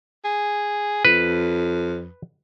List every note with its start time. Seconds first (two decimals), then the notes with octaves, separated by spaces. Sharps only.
0.25 G#4
1.05 F2 B4